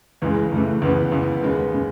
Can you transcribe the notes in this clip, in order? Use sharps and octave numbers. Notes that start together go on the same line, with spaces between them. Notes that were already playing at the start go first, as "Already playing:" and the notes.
C#2 C#3 E3 G#3
C#2 C#3 E3 A3
C#2 C#3 E3 B3
C#2 C#3 E3
D#2 C#3 G#3
C#3 G#3